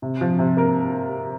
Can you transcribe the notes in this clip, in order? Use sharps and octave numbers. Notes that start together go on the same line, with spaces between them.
C3
F3
C3
A#3 A#4